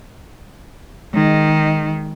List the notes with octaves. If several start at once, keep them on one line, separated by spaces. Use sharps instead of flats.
D#3 G#3 D#4